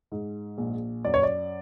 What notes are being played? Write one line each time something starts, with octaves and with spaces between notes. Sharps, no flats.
G#2
A#1
F#2 D5
C#5
D5